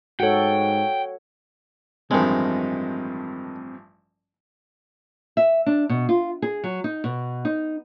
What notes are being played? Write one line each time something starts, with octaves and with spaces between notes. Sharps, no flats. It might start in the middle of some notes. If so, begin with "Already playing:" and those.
G#2 F#4 A4 C#5 F#5 G5
A1 G2 D#3 F3 G#3 C4
E5
D4
B2
F4
G#4
F#3
D#4
B2
D#4